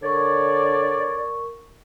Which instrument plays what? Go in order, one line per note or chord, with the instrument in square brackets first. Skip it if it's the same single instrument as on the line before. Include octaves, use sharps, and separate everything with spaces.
[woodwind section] D3 C#5 D5 [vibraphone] A#4 C#6